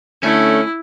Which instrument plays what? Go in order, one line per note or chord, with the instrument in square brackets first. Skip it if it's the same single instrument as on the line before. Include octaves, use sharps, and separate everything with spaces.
[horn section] D3 A3 [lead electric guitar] C#4 [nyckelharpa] E4